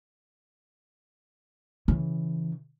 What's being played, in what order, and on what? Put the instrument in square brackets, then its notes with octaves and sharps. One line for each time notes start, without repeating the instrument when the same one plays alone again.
[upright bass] C#3 E3